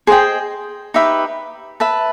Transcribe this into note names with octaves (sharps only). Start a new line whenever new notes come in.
G#4 C5 D#5 G5
D#4 G4 B4 E5
B4 E5 A5